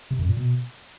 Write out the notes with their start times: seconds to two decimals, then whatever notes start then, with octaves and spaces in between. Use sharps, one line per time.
0.11 C3
0.19 F#2
0.28 A#2
0.37 B2